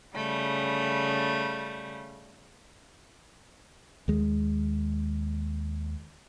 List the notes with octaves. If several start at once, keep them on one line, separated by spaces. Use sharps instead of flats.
C#3 G3 A3
D#2 G#3